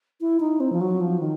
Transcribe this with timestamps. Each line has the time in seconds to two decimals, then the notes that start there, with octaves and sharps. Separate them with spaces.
0.21 E4
0.40 D#4
0.60 C4
0.72 F3
0.81 F#3
1.00 F3
1.20 D#3